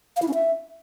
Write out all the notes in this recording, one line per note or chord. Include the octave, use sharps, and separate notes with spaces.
F5
E4
C#4
E5